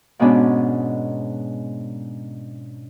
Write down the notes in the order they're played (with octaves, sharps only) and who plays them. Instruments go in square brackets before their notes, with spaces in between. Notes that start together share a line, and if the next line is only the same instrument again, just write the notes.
[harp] G#2 B2 G#3 B3 C#4 D4